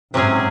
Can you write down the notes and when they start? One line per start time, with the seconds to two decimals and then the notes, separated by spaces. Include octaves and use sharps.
0.14 G#2 C3 F#3 C#4 G#4